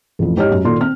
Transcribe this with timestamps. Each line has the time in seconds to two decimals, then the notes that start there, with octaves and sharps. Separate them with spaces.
0.19 A1 F2
0.36 G#2 G4 C#5 D#5 F6
0.51 F#2
0.65 A#2 D#3 A4 C6
0.80 C4 F6